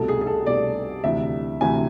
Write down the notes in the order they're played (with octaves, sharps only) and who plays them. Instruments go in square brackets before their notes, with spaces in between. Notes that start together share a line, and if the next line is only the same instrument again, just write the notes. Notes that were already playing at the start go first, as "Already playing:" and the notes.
Already playing: [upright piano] C2 B2 A3 A4
G#4
G#4
A4
C2 B2 A3 D5
D2 C3 E3 E5
D2 C3 E3 G#5